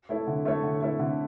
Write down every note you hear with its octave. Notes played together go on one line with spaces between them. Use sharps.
A3 E4 A4 C#5
D3
A3 E4 A4 C#5
D3
A3 E4 A4 C#5
D3